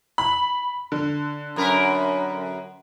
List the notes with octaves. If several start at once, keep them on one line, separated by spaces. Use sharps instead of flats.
B5
D3
F#2 A#4 B4